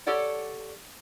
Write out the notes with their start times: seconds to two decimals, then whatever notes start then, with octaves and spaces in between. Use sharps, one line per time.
0.07 G4 A4 C#5 D5 F#5